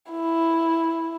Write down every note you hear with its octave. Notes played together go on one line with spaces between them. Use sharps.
E4